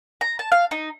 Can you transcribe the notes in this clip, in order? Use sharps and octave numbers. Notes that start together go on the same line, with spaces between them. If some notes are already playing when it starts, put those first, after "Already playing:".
A#5
A5
F5
D#4